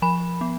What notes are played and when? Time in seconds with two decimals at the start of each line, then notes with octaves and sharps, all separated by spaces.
0.02 F3 B5
0.41 B3